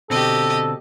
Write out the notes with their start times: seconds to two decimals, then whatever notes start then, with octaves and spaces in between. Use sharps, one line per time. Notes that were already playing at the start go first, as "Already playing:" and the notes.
0.10 B2 D3 C4 G4 A4 D#5